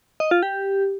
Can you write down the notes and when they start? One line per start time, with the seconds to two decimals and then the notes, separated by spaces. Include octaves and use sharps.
0.20 D#5
0.31 F4
0.43 G4